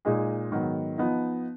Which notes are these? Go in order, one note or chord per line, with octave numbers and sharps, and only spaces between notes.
A#2 G#3 D#4 G#4
G#2 D#3 F#3 B3
F3 B3 D#4